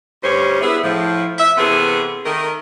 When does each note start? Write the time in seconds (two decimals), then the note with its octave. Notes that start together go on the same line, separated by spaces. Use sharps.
0.23 D2 G2 G3 C#4 C5 C#5
0.61 B3 E4 G#4
0.82 A2 F3
1.39 E5
1.57 C3 E3 B3 C#4 G#4 A4
2.24 D#3 A3 A#4